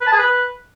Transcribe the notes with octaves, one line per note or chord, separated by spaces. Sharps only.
B4
A5
G#4
B4